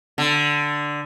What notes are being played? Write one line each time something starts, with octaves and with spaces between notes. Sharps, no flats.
D3